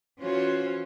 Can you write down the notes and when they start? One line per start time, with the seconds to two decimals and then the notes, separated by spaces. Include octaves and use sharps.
0.20 E3 C#4 F4 F#4 C5 C#5